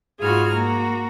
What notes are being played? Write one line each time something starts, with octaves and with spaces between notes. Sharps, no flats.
G#2 F4 F#4 G#4 B5 F6
A#3 F#4 A#5